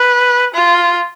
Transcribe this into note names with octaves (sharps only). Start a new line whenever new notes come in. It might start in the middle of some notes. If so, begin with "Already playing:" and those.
Already playing: B4
F4